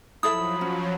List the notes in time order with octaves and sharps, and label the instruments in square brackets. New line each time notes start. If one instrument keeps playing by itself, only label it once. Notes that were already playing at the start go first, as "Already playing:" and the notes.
[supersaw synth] F3 F#3 [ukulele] E4 A4 E5 [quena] B5 [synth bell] D#6
[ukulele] C#4